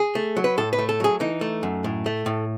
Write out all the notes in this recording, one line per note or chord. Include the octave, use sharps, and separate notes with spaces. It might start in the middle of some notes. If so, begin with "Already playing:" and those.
Already playing: G#4
A3
F#3
B4
A2 A4
B4
A3
A4
F#3 G#4
E3 D#4
A3
F#2
A2
A3
A2